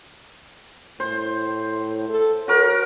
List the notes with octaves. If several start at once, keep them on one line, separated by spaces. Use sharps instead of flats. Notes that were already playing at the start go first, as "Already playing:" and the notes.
A2 C5
A4
F#4 A#4 C#5